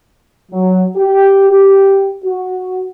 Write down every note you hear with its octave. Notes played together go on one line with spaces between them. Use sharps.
F#3
G4
G4
F#4